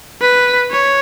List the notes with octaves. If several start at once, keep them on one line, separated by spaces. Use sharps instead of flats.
B4
C#5